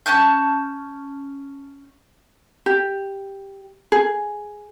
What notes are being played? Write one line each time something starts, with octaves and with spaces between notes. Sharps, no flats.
C#4 A5 F#6 G6
G4
G#4